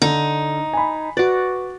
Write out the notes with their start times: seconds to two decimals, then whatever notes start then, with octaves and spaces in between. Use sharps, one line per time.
0.02 D3 D#4
0.73 G#5 B5
1.17 F#4 B4 D5